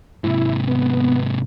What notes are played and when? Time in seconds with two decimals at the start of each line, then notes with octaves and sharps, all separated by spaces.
0.24 G#2 C3 E4
0.68 B3